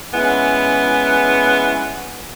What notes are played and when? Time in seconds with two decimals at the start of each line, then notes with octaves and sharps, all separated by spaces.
0.14 G#3 B3 C#4 E4